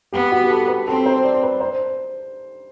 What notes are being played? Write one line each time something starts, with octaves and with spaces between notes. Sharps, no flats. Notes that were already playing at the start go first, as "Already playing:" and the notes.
B3 G4
F#4
G4
A4
B4
C4 A4
C5
D5
B4
C5